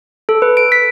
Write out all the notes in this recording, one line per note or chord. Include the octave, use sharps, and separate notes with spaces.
A4
B4
D7
B6